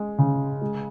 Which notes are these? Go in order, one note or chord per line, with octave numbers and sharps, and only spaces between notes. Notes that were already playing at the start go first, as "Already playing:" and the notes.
Already playing: G#3
C#3
G#3